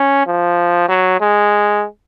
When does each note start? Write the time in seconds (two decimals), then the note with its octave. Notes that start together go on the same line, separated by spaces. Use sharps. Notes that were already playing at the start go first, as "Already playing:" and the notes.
Already playing: C#4
0.27 F3
0.89 F#3
1.20 G#3